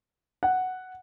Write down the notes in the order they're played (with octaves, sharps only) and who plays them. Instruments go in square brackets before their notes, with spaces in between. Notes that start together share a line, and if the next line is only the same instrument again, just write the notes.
[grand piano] F#5